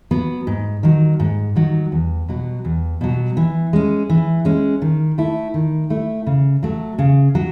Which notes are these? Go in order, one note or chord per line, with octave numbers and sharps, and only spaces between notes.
F#3 B3
G#2
D#3 F#3
G#2
D#3 F#3
E2
B2 F#3
E2
B2 F#3
E3
G#3 C#4
E3
G#3 C#4
D#3
A3 E4
D#3
A3 E4
C#3
F#3 A3
C#3
F#3